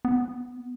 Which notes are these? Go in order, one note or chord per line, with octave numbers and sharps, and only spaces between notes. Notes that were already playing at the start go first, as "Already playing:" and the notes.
B3